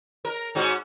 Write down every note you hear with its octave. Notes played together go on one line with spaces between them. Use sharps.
A#4
G#2 C#4 F#4